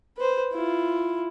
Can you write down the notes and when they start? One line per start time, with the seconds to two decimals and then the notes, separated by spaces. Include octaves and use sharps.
0.17 B4 C5
0.52 E4 F4